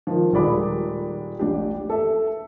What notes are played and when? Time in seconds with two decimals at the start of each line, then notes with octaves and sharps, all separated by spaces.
0.07 D#3 F3
0.33 D#1 D#3 G#3 D5 B5 D6
1.39 A1 D4 G4
1.90 A4 E5